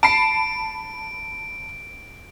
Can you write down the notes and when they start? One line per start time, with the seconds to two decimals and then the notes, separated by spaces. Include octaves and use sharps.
0.03 A5 B5 C7 D7